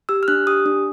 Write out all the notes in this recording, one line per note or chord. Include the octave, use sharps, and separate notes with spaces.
G4 E6
F6
D4 F#6
G4 D#6
D4